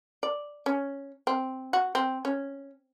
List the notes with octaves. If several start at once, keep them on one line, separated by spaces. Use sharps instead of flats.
D5
C#4
C4
F#4
C4
C#4